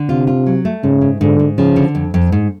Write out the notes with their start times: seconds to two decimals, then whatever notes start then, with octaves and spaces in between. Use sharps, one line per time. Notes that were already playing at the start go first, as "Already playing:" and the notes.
Already playing: D3
0.08 C3 F4
0.27 F4
0.46 F#3
0.65 A3
0.83 G#2 C#3
1.01 G#2
1.21 G#2 D3
1.39 G#2
1.58 C#3 F3
1.76 D3
1.95 F2
2.14 F2
2.32 G#2